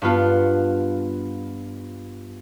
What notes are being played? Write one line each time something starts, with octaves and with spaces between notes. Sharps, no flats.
G2 B3 F4